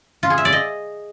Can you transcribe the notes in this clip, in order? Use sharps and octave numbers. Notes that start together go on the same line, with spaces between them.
F4
G#4
E5
D5
D#5